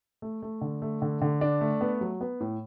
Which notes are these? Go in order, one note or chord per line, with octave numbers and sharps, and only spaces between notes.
A3
A3
D3
A3
D3
D3
D4
A3
B3
F#3
B3
A2